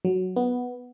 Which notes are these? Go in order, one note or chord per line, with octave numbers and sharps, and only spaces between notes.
F#3
B3